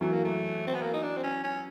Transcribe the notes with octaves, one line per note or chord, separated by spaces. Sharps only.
E3 F#3 A3
A#3
A3
C4
B3
A#3
D#4
D4
C4
C#4
C#4